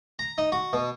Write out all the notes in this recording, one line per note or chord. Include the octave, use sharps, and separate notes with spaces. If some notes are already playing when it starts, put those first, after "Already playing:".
A#5
D#4
F#4
B2